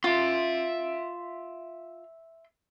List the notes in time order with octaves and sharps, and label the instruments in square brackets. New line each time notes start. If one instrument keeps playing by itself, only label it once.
[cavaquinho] F4 [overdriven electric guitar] E5 C6